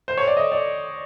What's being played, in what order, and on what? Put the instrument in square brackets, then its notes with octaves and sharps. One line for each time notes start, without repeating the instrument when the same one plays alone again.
[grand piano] C5
C#5
D5
D#5
D5